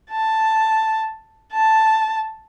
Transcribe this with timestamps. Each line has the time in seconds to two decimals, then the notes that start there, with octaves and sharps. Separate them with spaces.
0.11 A5
1.53 A5